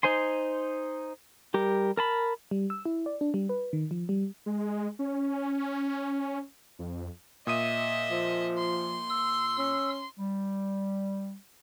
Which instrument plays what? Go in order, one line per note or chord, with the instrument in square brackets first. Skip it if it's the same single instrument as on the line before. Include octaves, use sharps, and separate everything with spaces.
[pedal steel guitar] D#4 C5 G#5 C6
G3 G4 A#4
A#4 A5 B5
[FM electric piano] G3
E6
E4
D5
D4
G3
B4
D#3
F3
G3
[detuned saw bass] G#3
C#4
F2
[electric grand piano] A#2 D#6 D#7 [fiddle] D#5 E5
[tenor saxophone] F3
[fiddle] C6
[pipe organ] E6
[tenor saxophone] C#4 [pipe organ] E6
[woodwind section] G3